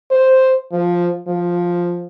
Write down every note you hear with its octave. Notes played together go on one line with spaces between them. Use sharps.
C5
F3
F3